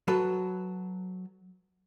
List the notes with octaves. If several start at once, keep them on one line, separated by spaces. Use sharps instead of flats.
F#3 A4 B4